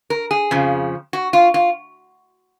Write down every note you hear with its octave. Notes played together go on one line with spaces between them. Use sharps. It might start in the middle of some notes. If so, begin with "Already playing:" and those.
A#4
G#4
F2 C#3 F3
F#4
F4
F4